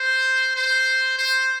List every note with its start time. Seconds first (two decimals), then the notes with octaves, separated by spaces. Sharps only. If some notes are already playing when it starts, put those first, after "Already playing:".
Already playing: C5
0.55 C5
1.18 C5